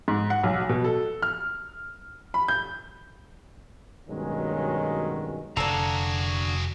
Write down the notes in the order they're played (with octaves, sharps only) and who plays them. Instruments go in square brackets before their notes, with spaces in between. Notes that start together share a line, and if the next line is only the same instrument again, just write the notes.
[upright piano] G#2
F#5
B1
B2
A4
F6
B5
G6
[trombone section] G2 B2 D#3 F#3 G#3 C#4
[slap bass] F1 [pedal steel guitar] D3 F5 A#5 [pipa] D4 A4 [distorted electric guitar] F#4 G#4